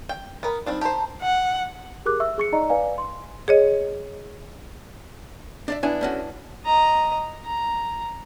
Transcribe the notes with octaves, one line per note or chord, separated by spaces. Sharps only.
G5
B3 A#4 B5
G3 C4 D4 D#4
G4 C5 A5 A#5
F#5
G4 G#4 A#4 D6 F#6
E5 C#6 E6
G#4 C#6 C#7
D#4 D5 D#5 A#5
B4 D5 F5 G#5
C6
G#4 C#5 D#5
D4 D5 E5
B3 D4 E4 G#5
A3 C#4 F#4
D#5 A#5
A#5